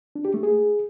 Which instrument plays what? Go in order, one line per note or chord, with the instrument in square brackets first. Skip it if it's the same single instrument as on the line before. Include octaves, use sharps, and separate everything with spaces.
[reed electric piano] D4
G4
A3
G#4